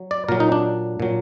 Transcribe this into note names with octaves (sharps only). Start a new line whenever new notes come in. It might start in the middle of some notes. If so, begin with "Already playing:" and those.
Already playing: F#3
D5
A#2 F#3 A#4
D#4
D4
A#2 F#3